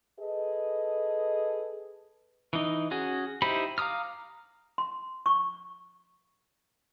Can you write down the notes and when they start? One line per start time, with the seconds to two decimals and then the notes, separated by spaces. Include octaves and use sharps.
0.18 G#4 A4 B4 D#5
2.53 E3 D#4
2.91 C#4 F#4 G#4
3.42 D#4 E4 G4 C5 B5
3.78 F5 A#5 D6 D#6 F6
4.78 C6
5.26 C#6